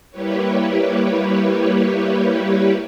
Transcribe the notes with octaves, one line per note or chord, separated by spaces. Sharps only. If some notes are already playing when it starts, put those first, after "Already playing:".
G3 A#3 E4 G4 B4 C#5